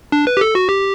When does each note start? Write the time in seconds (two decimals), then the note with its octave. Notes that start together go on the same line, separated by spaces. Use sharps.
0.12 D4
0.27 B4
0.37 G4
0.41 A4
0.55 F#4
0.69 G4